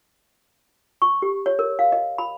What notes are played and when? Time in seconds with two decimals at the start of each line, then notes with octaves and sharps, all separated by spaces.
1.02 C#6
1.22 G4
1.46 C#5
1.59 A#4
1.79 F5
1.92 D#5
2.18 B5